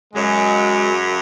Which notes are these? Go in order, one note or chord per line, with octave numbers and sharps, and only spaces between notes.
F#2 C#3 F#3 G#3